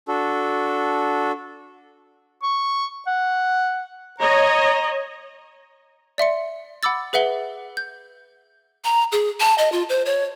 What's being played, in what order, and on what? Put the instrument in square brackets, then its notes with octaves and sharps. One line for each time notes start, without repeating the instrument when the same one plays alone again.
[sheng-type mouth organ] D4 F#4 A4
[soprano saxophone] C#6
F#5
[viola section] C#5 D#5 [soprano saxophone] A#5
[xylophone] D5 E5 C6 C#7
F#5 B5 D6 E6 A6
G#4 B4 E5 F#5 G7
G6
[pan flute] A#5
G#4
A5
D#5
F4
C5
C#5